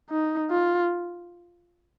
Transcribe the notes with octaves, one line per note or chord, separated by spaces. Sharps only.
D#4
F4